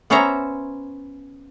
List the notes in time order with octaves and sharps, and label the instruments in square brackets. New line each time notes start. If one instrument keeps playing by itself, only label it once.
[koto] B3 C#4 C5 C#5 E5 A#5